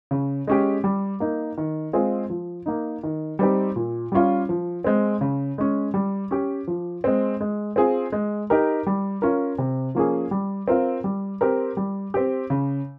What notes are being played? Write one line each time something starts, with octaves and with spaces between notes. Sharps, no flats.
C#3
G#3 C#4 G4
G3
A#3 D#4
D#3
G#3 C4 F4 G#4
F3
A#3 D#4
D#3
G3 C4 D#4 G4
A#2
G3 C#4 F4
F3
G#3 C4
C#3
G#3 C#4
G3
C#4 G4
F3
G#3 C4
G#3
C4 F4 G#4
G#3
D#4 G4 A#4
G3
C#4 F4 A#4
C3
F3 A#3 C#4 G#4
G3
C4 F4 A#4
G3
C4 G4 A#4
G3
C4 G4
C#3